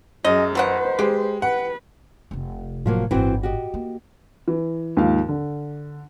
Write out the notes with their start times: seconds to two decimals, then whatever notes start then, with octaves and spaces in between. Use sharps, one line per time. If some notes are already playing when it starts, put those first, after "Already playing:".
0.25 F#2 F#3 G#4 D#5
0.55 B2 D#3 B4 C5 F#5
0.99 G#3 G4
1.42 B4 F#5
2.31 F1 C3
2.86 A2 F3 F#3 A#3
3.11 D1 G1 E3 C4 F#4
3.43 F#4 G4 D#5
3.74 A#3
4.48 E3
4.97 D#2 G#2 F3 F5
5.29 D3